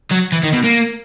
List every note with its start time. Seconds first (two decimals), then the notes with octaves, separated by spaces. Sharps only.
0.11 F#3
0.32 E3
0.43 D#3
0.54 B2
0.64 A#3